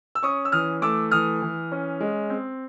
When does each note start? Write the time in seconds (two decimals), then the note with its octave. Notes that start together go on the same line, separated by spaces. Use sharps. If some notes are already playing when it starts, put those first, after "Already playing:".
0.15 E6
0.23 C#4 C#6 D#6
0.45 E6
0.52 E3 D#6 F6
0.82 A3 D6 E6
1.11 E3 D#6 F6
1.42 E3
1.72 C#4
2.00 G#3
2.30 C4